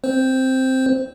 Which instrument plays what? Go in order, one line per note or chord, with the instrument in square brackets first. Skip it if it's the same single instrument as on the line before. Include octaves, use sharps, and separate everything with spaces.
[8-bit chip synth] C4 C5